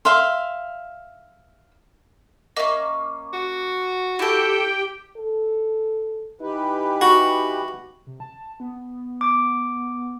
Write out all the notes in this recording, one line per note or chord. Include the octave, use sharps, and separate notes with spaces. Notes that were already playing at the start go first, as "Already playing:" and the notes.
E5 F5 C6
A#3 C#4 D#5 E5
F#4
E4 G4 A4 G5
A4
E3 D#4 G4 B4
F#4
C3
A5
B3
D6